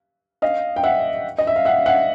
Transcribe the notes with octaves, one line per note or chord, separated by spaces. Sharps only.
D#5 F5
G5
E5 F#5
D#5
E5
F5
E5 F#5
E5 F#5